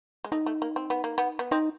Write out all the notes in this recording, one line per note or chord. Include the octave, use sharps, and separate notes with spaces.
G#3
A3 D#4
A3
A#3
C4
B3
A#3
B3
B3
C4 D#4